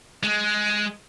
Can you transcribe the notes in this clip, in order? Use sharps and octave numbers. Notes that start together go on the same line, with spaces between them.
G#3